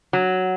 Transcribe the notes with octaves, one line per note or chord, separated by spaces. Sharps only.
F#3